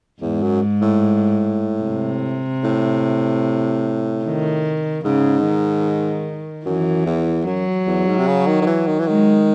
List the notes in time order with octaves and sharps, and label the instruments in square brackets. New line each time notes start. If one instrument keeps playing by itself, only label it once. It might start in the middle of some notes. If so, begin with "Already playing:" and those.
[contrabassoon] E2 [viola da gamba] G#2
[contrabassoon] F#2
A2
[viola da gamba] C3
[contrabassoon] A2
[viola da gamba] D#3
[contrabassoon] G#2 [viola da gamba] C#3
[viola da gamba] D#3
[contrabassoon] F#2 [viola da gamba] E3
[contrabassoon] E2
[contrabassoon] F#2 [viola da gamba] F#3
[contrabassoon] E2
G#2
C3
C#3
D#3
D#3
E3
D#3
E3
[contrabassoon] D#3 [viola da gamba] G#3